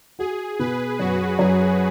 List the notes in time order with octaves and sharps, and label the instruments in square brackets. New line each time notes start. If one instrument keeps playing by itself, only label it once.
[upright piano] F#4 [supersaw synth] G#4
[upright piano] B2 [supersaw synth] B4
[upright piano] F#2 [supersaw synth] F#4
[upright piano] F#2 [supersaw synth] G#4